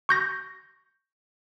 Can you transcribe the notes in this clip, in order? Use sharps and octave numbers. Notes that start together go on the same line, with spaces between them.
C#6 G6 A#6